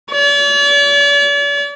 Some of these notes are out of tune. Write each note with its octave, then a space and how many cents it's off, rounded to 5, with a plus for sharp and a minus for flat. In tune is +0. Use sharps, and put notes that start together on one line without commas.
D5 -45